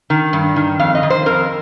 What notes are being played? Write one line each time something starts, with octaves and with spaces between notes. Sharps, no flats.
D#3
G2
D#3
F2 F5
D#5
D#3
C5
F2 A#4